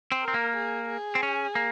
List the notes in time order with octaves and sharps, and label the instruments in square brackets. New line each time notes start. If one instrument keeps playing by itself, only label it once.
[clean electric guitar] C4
[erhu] A#4
[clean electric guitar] C4
A#3
[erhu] G#4
G#4
[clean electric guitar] C4
C#4
A#3